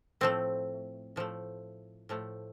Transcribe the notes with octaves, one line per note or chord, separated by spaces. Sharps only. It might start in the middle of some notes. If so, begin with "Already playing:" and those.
A2 F3 A3 C4
A2 F3 A3
A2 F3 A3